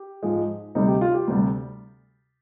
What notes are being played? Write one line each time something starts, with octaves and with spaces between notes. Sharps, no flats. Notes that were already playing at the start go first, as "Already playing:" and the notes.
Already playing: G4
G#2 F3 G#3
D2 C3 G3 D#4
G4
F4
G4
D2 C3 G3